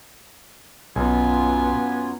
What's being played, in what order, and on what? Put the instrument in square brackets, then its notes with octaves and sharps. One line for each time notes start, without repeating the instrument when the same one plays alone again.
[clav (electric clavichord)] B1 [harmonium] F#2 F#3 F4 [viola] B3 [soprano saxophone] G#5